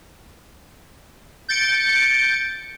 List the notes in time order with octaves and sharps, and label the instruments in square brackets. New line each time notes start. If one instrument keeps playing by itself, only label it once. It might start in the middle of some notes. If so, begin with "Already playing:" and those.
[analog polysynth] G6 A6 C#7 D7